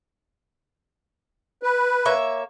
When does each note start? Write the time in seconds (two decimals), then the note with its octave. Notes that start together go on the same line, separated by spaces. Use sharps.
1.63 B4
2.05 A#3 C#5 E5